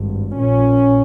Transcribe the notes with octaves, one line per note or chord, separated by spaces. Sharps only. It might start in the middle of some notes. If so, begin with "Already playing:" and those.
Already playing: G#1 G2
A#1 A#2 C#4